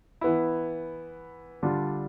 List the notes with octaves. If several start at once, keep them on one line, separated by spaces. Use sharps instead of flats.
E3 B3 E4
D3 G3 D4 F4